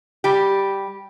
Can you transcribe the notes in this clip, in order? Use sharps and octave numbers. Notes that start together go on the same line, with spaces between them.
G3 G4